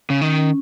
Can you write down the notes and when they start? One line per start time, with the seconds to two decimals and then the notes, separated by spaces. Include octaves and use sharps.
0.10 C#3
0.21 D#3 C#4